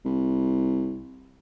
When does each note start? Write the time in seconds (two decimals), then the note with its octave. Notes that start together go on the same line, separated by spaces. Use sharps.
0.05 C2